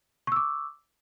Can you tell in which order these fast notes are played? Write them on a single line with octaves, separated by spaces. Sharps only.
C#6 E6 D6